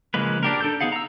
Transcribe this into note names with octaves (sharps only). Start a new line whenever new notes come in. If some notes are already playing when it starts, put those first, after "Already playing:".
C#3 F3 G#3 A#3 B4
D4 G4 A#4
D4 A4 G6
B3 D#4 G#4 F5 F#5
A#5 E6